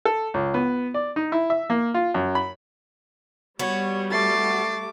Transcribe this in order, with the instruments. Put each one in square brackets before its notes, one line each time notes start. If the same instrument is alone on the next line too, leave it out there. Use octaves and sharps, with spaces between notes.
[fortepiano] A4
C#2
B3
D5
D#4
E4
E5
A#3
F4
F#2
B5
[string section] G3 [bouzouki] B3 F#4 [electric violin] C#5
[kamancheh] A3 D6 [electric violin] A6 C7